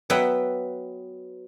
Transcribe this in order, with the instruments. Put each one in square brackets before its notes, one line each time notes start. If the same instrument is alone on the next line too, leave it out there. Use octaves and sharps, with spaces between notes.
[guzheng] F#3 B3 B4 E5 F#5 G5